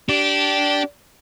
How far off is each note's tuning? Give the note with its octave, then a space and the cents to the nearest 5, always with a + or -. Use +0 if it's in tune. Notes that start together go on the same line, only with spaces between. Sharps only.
D4 -10 G4 -20